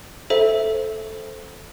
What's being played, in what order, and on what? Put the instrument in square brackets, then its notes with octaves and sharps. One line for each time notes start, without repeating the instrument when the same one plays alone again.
[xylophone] A4 C5 E5